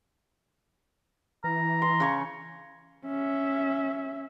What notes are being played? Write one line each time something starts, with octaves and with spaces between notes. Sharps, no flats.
E3 A#5
C6
C#3 C#5 C#6
C#4 E5